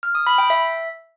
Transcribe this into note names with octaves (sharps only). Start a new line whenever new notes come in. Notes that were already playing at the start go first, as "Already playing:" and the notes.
F6
D#6
B5
G5
E5